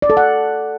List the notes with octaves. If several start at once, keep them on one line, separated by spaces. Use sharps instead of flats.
D5
A4
F#5